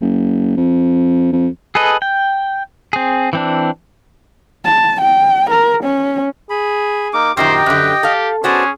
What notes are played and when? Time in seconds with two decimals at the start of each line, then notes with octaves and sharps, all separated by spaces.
0.01 F#1
0.57 F2
1.33 F2
1.75 G#4 A4 B4 D#5
2.02 G5
2.93 C4 G#4
3.33 E3 C4 D4
4.65 A5
5.01 G5
5.50 A#4
5.83 C#4
6.50 G#4 B5
7.14 A#3 D#4 A#4 D6
7.37 F#2 A#2 D#3 G4 C5 D#5 G5
7.66 F#2 D3 B4
8.03 G4 A4 F5
8.44 B3 C#4 F#4 G#4 C5 D5 A5